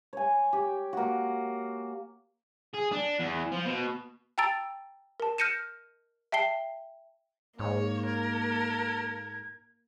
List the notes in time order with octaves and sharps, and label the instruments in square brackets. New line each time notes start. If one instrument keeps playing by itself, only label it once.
[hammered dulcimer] C#5 G#5
G4
A#3 F#4
[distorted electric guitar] G#4
D4
E2
F3
B2
[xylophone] G5 A5 A#5 E6 A6 D7
A#4 A5
F6 G6 A#6 C#7 D#7 E7
E5 G5 A5 C7 G7
[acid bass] G#2 [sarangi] A#3 [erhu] C#5
[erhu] A#4 [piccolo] G#6